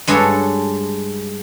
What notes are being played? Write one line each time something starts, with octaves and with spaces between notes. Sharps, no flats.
G2 G#3 D4 F#4 A4 C#5